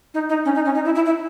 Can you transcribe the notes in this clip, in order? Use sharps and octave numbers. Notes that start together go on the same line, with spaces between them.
D#4
D#4
C#4
D#4
C#4
D#4
E4
E4
E4